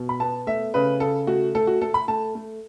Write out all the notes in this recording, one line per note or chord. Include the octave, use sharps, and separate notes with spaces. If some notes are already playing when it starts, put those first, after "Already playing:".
Already playing: B2
B5
B3 A5
A3 E5
C#3 B4
C#3 A4
A3 F#4
A3 A4
F#4
A3 A4
B5
A3 A5
A3